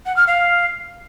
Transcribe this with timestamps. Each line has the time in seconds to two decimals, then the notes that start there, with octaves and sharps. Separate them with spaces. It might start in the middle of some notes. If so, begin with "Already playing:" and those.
0.06 F#5
0.17 F6
0.27 F5